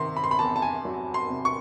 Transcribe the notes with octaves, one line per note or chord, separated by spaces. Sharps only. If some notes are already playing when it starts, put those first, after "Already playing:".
Already playing: C3 D#3 C6
B5
C6
B5
E2 A5
A5
G#5
F#3
C6
C3
C#6